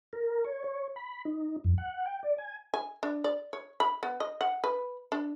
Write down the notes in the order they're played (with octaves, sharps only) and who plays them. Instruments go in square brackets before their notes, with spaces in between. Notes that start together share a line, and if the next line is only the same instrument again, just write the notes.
[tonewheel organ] A#4
C#5
C#5
B5
D#4
F2
F#5
G5
D5
G#5
[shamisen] G#5
D4
D5
C#5
B5
B3
D#5
F#5
B4
D4